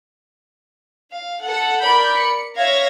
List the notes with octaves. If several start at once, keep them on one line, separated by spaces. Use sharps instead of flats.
F5
A4 F#5
A#4 D5 B5 G6
C#7
C#5 E5 F5 G#6 A#6